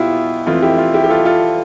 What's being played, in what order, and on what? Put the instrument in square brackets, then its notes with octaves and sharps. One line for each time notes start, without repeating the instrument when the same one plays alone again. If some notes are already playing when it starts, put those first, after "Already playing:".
Already playing: [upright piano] B2 E4 F4 G4
F2 E3 A3 F4
E4 G4
F4
E4 G4
G4
F4 A4
F4 A4